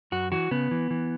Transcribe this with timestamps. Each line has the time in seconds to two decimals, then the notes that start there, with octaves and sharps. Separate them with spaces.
0.12 F#2 F#4
0.32 E3 F#4
0.51 C#3 B3
0.71 E3
0.91 E3